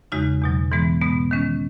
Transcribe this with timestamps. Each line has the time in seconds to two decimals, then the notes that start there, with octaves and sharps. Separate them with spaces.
0.12 E2 C#3 G#3 D#4 F#4
0.42 E2 B2 F#3
0.72 G#2 E3 G#3 B3
1.02 B2 G#3 B3
1.31 D#3 G#3 C#4